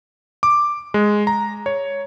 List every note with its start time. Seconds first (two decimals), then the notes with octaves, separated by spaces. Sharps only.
0.43 D6
0.94 G#3
1.27 A#5
1.66 C#5